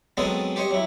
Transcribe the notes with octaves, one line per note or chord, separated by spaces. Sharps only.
F#3 G#3 B3 C4 G#4 A4
G4 C5 C#5 D#5
F#3 E4